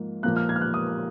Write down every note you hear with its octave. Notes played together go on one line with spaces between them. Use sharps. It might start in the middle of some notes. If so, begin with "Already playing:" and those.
Already playing: G#2 F3 A#3
A#2 F3 A#3 F#6
F6
G#6
F6
F#6
D#6